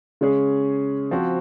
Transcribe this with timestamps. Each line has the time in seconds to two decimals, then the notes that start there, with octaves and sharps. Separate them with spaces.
0.21 C#3 G#3 C#4 G#4
1.11 F3 C4 F#4